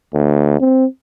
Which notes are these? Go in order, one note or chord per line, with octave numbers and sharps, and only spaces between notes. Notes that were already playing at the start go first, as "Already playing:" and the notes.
D2
C4